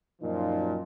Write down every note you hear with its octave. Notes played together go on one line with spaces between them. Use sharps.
F#2 A#2 F3 D#4